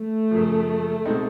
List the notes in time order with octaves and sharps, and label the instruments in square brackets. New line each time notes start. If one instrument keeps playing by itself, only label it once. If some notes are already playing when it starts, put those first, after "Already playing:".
Already playing: [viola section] A3
[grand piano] F#2 C#3 F3
B2 G#3 C4 D#4